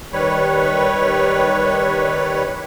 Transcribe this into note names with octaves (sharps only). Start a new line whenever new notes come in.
D#3 G3 B4 C#5